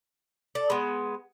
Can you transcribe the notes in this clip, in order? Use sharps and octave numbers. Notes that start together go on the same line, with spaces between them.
A4 D5
G#3 B3